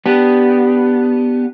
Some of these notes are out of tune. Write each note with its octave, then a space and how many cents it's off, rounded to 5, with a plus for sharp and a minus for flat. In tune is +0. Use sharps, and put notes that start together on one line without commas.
B3 +0 D4 +0 G4 +0